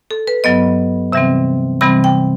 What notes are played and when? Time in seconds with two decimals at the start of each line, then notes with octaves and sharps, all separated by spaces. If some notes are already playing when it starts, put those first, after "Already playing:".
0.11 A4
0.27 B4
0.44 G2 F#3 B3 D#5
1.12 C3 E3 G3 C4 E5
1.81 C3 E3 G3 C4 B5
2.04 G5